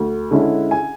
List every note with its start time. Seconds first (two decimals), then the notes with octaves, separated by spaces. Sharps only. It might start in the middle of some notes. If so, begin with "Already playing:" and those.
Already playing: D2
0.31 D3 G#3 C#4 E4
0.71 G#5